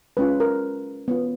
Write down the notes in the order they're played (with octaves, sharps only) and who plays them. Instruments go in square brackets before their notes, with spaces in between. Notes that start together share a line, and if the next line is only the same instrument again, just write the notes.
[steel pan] G#3 C#4 F4 B4
A#4
B3 F4